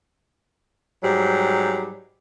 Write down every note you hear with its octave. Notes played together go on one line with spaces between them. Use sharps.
G#2 F#3 G3